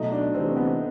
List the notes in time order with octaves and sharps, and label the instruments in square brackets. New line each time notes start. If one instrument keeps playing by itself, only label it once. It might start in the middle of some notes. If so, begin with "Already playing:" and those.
Already playing: [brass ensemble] B2 F#3 A3 [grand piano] D#4
[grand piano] D4
[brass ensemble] D2 C3 E3 A3 [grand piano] C4
[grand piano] B3